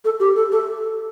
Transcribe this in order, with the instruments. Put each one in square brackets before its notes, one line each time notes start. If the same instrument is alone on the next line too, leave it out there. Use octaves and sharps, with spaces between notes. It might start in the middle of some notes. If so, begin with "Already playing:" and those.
[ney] A4
G4
A4
A4